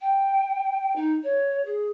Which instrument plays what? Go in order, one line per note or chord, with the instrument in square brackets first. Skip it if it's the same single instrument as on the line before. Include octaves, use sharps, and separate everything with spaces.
[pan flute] G5
D#4
C#5
G#4